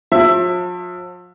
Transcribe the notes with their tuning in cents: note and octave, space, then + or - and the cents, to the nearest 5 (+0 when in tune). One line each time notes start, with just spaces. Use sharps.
F3 +40 E5 +15